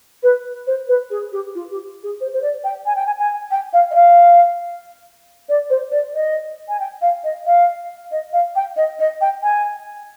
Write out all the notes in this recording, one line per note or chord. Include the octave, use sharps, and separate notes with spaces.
B4
C5
B4
G#4
G4
F4
G4
G#4
C5
C5
D5
G5
G#5
G5
G#5
G#5
G5
F5
D#5
F5
D5
C5
D5
D#5
G#5
G5
F5
D#5
F5
D#5
F5
G5
D#5
D#5
G5
G#5